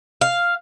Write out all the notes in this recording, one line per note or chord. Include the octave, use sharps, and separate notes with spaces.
F5